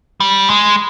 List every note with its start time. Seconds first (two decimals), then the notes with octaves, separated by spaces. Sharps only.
0.20 G3
0.49 G#3